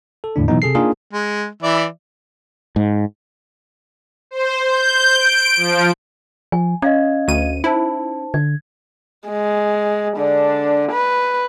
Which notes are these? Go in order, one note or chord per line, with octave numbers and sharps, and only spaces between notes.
A4
E2 A2 D3 D4
B2 E3 F#3 B3 D#4
C3 G#4 A4 C7
A#3 D4 D#4 F4 G#4 A#4
G#3
E3 D5 E5
G#2
C5
G6
D7
F3
F3 G#5
C#4 D#5 F5 G#6
D2 D#7
D#4 E4 C5 A5
D3 G#6
G#3
D3 D4
B4